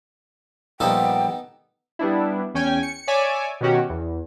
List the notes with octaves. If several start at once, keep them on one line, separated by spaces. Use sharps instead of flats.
A#2 F3 G3 B3 D#4 A4 G5
G3 B3 D4 E4
E2 C#4 G5 G#5
C#7
C#5 D5 E5 G#5 D6
B2 D#3 C#4 F#4 G4
E2